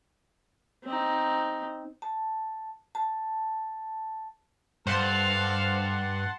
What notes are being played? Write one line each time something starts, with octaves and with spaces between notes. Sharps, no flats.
C4 D#4
A5
A5
G2 A4 C5 F5 F#5 A5 C6